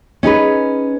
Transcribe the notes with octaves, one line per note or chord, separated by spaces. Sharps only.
C#4 D#4 G#4 B4